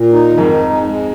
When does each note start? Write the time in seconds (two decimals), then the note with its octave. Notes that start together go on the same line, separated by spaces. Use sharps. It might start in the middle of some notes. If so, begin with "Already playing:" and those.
Already playing: A#2
0.13 D#4
0.31 D#3
0.38 F2 G#2
0.50 D#4
0.70 G#3
0.89 G#3